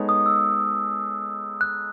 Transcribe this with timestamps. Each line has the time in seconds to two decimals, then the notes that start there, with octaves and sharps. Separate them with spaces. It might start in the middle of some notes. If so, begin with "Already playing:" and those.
Already playing: G#3 B3 D#4 A4 C#5
0.09 D#6
0.26 E6
1.61 F#6